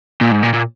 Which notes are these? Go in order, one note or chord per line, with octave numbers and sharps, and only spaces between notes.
A#2
G#2
A#2
A#2